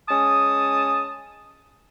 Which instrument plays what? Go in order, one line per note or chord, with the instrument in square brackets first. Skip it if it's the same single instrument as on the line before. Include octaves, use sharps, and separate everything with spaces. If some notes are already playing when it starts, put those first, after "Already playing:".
[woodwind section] G#3 C#4 A5 D#6